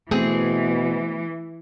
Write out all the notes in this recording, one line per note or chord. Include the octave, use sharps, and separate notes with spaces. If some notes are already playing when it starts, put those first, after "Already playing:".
B2 E3 A3 C4 G#4